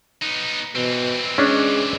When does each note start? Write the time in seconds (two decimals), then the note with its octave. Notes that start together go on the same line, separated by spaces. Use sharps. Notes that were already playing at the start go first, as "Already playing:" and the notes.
0.22 B3 D#4
0.75 B2 E3 C4
1.38 G#3 C#4 D4